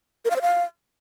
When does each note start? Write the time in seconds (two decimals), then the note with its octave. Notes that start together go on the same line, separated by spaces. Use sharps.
0.25 A#4
0.30 F5
0.36 C5
0.42 F5